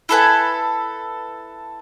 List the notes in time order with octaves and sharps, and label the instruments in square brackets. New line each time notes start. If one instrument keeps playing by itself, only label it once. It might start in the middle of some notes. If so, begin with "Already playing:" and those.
[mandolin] E4 A4 B4 G#5